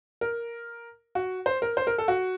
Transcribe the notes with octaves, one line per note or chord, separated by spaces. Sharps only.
A#4
F#4
C5
A#4
C5
A#4
A4
F#4